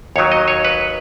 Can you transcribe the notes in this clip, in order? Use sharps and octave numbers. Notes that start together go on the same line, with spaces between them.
D#2 D#3 F#3 C#5
D#5
C#5
B4